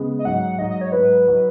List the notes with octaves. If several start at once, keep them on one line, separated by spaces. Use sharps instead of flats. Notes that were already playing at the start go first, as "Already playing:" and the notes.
Already playing: C#3 G#3 B3
D#5
G#2 F#3 D#4 F#5
G#2 F#3 D#4 D#5
D#5
C#5
G#2 F#3 D#4 B4
F#3 D#4